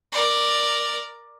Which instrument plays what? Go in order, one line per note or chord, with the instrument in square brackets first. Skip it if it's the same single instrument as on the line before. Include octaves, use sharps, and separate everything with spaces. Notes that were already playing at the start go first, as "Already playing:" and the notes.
[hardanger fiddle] A#4 D5